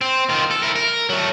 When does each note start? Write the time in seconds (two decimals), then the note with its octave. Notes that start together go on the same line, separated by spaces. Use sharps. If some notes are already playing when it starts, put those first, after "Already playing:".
0.01 C4
0.29 D#3 F4
0.51 A4
0.63 E4 A#4
0.76 A#4
1.10 F#3 A3